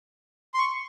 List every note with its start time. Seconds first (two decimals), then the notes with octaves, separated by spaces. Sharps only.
0.54 C6
0.58 C#6